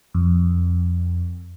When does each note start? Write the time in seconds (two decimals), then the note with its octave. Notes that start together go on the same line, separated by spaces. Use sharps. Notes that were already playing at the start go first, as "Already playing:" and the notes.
0.14 F2